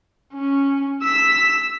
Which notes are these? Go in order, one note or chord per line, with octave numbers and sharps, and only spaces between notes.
C#4
E6 B6